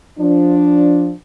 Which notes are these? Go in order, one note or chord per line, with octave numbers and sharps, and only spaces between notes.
F3 D4